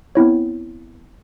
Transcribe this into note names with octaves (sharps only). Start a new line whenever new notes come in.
B3 C4 E4 C#5